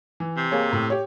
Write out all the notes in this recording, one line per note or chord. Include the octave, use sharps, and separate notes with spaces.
E3
C3
A#3 G#4 C#5
A2
G4 C#5